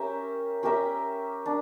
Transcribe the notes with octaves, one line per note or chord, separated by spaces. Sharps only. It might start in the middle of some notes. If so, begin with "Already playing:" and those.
Already playing: C#4 G4 A#4 E5
C#4 G4 A#4 E5
D4